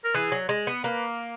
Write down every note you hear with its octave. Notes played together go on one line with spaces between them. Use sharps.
A#4
E3 G#4
F#3
G#3
B3
A#3 B4